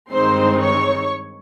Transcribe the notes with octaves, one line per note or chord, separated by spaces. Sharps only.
G2 D#3 G#3 C4 D#4 C5 C6
C#5 C#6